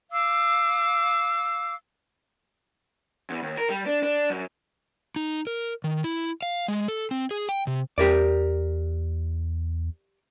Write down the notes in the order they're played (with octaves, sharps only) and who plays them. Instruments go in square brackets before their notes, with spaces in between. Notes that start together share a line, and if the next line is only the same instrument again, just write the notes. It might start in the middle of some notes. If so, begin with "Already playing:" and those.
[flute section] F5 D6 E6
[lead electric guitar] E2
D#2
A#4
G3
D4
D4
F#2
[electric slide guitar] D#4
A#4
D#3
E4
F5
G#3
A4
C4
G#4
G5
C3
[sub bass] E2 [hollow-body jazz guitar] G4 A#4 D5